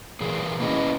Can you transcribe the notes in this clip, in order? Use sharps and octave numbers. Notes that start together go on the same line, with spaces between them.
A#2 E3 G#4
A#3 C#4 E4 B4 D#5